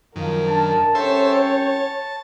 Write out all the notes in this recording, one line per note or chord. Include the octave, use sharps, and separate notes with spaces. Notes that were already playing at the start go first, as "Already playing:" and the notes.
F#2 D#3 F3 A#4
D4 A5
C2 C#4 A4 C5 C#5 E5 G5
A5